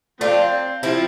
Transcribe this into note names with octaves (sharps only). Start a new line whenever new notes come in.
F3 A3 C4 D4 F4
C3 F3 C4 E4